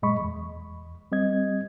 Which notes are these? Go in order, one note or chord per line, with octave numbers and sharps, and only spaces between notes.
F#2 A#2 G#3 D#5 B5 C#6
E2
G3 C4 D#5 G#6